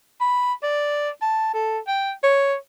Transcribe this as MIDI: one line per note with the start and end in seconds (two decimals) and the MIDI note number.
0.21 0.53 83
0.63 1.10 74
1.22 1.52 81
1.54 1.79 69
1.88 2.12 79
2.24 2.55 73